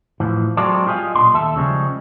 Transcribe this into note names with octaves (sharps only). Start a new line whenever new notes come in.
A2 E3 F3
F#3 G#3 C4 F4 A4 D5
F4 G4 G#4 B4 D#5 F5
B1 A#2 D4 C6
D#2 A4 E5
C#3 F3 G3 G#3